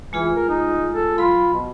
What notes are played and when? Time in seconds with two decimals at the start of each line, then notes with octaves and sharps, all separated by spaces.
0.13 E3 G#3 F4 G#4
0.36 A#4
0.49 D#4
0.93 A4
1.18 F#3 F4 B5
1.53 B2